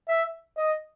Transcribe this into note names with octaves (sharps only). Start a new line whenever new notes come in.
E5
D#5